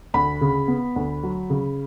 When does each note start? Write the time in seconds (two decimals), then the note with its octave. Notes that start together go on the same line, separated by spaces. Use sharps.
0.14 D2 B5
0.41 C#3
0.68 B3
0.96 D2
1.23 F#3
1.50 C#3